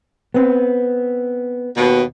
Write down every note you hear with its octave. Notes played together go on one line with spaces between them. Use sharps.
B3 C4
D#2 B2